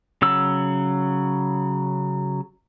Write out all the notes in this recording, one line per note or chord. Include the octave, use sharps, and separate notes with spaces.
C#3 F#3 E6